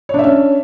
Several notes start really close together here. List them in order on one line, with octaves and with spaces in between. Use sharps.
C#5 D4 E5 C#4